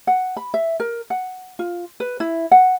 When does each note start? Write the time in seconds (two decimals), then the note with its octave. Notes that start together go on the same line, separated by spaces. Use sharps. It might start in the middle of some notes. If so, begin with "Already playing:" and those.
0.07 F#5
0.37 B5
0.54 E5
0.80 A#4
1.10 F#5
1.59 F4
2.00 B4
2.20 E4
2.52 F#5